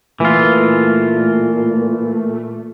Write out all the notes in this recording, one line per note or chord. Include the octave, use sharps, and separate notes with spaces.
A#2 E3 A3 F4